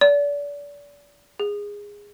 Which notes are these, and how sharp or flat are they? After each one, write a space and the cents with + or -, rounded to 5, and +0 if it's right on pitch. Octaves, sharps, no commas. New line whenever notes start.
D5 -30
G#4 -15